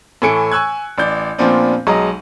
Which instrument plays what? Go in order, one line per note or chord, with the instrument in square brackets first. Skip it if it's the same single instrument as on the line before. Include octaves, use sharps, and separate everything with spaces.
[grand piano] A2 E3 A3 G#5 C#7 D7
G#5 C#6 E6 F#6 G#6
A1 D5 G6
A#2 F3 B3 C4 D4
B1 F#3 G#3 D#5 A#5